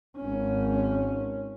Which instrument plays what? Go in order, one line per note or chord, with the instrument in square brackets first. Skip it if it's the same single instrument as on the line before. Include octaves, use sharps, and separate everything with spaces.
[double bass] G#1 C#4